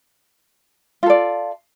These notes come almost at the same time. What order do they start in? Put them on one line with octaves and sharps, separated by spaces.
F4 A4 D5